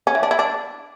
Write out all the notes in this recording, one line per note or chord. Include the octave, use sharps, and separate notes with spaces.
C#4
E3
D4
E4
D4